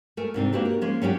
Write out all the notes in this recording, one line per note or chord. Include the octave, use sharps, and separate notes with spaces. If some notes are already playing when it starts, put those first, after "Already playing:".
A3 A#4 G#5
G#2 C3 C4 D4
A#3 D4 F#4 G4 B4
A#4
F3 G#3 A#3 C#4 G#4
F#3 C#4 D4 G4